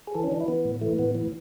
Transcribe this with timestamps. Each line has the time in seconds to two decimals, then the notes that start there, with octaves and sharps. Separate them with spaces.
0.07 G#4
0.15 E3 A4
0.24 C#4
0.32 E3 D4
0.40 E4
0.48 E3 B3
0.65 A2
0.81 E3 A3
0.99 A2 B3
1.15 E3